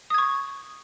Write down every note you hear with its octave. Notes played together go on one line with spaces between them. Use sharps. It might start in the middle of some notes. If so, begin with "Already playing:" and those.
C#6 D#6 G#6